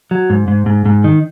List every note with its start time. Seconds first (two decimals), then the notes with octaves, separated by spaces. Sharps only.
0.11 F#3
0.30 G#2
0.48 G#2
0.66 G#2
0.86 G#2
1.04 D#3